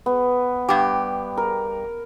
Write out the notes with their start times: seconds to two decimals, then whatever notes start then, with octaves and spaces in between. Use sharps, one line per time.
0.06 B3
0.69 G2 G4
1.37 A#4